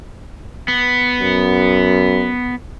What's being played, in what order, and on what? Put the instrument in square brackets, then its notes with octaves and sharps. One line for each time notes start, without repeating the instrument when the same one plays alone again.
[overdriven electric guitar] B3
[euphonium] F#2